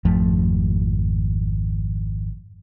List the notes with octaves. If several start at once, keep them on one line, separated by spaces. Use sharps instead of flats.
G#1 F2 F3 A3